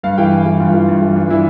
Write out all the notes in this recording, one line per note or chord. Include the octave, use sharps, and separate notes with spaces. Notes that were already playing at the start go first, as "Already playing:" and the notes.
G2 F5
E3 G5
G2
E3
G2 F4
E3
G2
E3
G2 D4
E3 E4